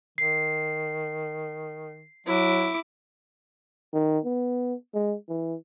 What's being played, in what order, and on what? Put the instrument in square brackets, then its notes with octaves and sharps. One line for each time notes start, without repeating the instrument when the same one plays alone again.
[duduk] D#3 [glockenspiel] C7
[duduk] F#3 [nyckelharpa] E4 D6
[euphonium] D#3
B3
G#3
E3